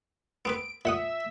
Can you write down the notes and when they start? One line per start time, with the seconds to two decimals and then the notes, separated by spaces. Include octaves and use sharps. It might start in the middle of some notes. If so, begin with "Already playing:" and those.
0.45 B3 C4 B4 D7
0.85 A#2 E5 F#5 D#6